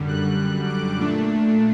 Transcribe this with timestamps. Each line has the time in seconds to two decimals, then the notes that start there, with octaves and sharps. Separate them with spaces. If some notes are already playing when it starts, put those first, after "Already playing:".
Already playing: F#2 D3 G3
0.08 F#6
0.38 F#6
0.68 D6
0.98 A#2 A3 D4